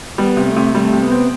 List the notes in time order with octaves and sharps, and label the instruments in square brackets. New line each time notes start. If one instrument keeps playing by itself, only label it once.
[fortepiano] G3 [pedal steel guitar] B3
[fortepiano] C3
[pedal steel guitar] A3
[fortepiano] C3
[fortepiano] G3 [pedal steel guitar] A3
[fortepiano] C3
[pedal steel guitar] B3
[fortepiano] C4